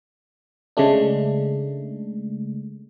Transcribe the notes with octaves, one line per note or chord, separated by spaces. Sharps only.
C#3 G#3 A3 D4